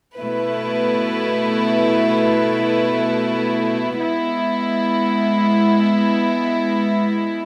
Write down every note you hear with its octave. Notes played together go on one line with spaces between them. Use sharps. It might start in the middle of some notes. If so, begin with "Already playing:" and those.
B2 A3 E4 B4
G#3 B3 E4